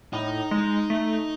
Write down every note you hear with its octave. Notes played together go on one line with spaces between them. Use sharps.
A2 D#4
G#3
A3